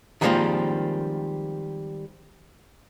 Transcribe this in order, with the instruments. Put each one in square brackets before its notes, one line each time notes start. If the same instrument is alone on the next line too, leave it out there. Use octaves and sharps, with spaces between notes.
[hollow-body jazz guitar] D#3 F3 G3 G#3 A#3 C4